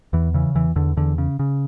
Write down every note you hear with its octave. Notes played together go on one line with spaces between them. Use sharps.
E2 E3
C#3 E3
E2 E3
E2 D3
E2 D3
C#3
C#3